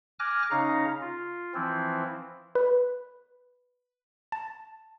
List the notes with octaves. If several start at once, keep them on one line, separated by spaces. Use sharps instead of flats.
G#5 D6 F6 F#6 A#6
C#3 C#4 D#4 F5 A#5
F4
E3 F3 C4 E4
B4
A5